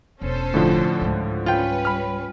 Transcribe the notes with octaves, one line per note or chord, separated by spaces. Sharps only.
E1 C#4 A4 C5
A2 D3 F3
C#2 G#2
G3 C#4 F4 B4 G5
B5 F6